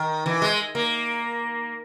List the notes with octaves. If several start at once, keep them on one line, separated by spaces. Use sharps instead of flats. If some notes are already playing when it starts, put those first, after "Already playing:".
Already playing: D#3
E3
G#3
A#3